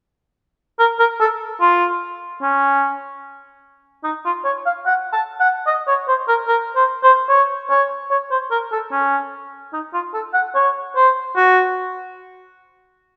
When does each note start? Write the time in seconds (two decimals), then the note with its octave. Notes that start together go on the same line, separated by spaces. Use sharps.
0.79 A#4
0.99 A#4
1.20 A4
1.61 F4
2.42 C#4
4.04 D#4
4.25 F4
4.45 C#5
4.66 F5
4.86 F#5
5.13 A5
5.40 F#5
5.67 D#5
5.88 C#5
6.08 C5
6.28 A#4
6.48 A#4
6.76 C5
7.03 C5
7.29 C#5
7.70 C#5
8.11 C#5
8.31 C5
8.51 A#4
8.72 A4
8.92 C#4
9.73 D#4
9.93 F4
10.14 A4
10.34 F#5
10.55 C#5
10.96 C5
11.36 F#4